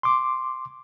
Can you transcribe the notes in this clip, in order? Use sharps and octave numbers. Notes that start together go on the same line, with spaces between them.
C6 D6